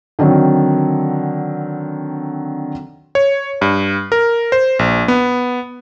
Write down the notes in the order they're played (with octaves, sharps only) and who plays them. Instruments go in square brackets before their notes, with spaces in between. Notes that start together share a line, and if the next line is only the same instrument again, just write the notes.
[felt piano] D3 D#3 F#3 C4
[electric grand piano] C#5
G2
A#4
C5
A#1
B3